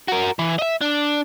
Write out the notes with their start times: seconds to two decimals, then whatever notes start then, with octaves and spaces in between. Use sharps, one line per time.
0.08 F#4 A#4
0.39 E3
0.59 D#5 E5
0.81 D4